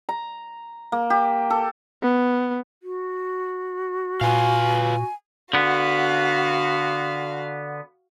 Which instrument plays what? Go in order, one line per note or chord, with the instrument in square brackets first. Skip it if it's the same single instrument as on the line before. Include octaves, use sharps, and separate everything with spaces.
[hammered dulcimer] A#5
A#3
G4
A4
[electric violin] B3
[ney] F#4
[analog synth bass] A#2 [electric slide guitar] F4 B4 F5 [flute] G#5
[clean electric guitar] D3 B3 [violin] F#4 F5